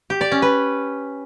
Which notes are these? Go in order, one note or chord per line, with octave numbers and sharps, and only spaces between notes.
G4
D5
C#4
B4